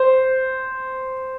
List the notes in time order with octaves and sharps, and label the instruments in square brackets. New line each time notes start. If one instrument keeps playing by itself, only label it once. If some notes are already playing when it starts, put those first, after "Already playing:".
Already playing: [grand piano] C5